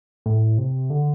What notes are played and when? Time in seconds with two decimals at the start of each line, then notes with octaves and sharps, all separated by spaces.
0.26 A2
0.58 C3
0.90 D3